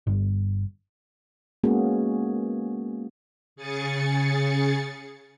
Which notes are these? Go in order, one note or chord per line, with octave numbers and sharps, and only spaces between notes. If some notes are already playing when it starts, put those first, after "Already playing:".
G1
G#3 A#3 B3 C#4 F#4 G#4
C#3 G#4 G#5 A6 C#7